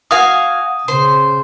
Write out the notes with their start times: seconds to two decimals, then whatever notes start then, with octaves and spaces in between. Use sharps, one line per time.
0.11 F#4 F5 G#5 D#6
0.88 C#3 C5